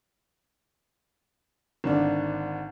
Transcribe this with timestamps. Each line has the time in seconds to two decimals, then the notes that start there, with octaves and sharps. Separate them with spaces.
1.84 G#1 D3 D4